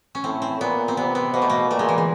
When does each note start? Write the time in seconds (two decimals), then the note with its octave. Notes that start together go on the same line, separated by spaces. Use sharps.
0.15 C#4
0.24 A2 C4
0.42 C4
0.60 A#2 B3
0.88 C4
0.97 C3 B3
1.15 B3
1.34 B2 A#3
1.42 A3
1.50 A#3
1.70 A#2 A3
1.79 G#3
1.89 E3
1.98 D3